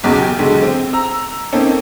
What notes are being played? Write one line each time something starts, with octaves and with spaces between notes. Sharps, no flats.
B1 E2 C#3
G4
B1 D3 G#3
C4
A#5 E6
A#3 C4 C#4 D#4 A4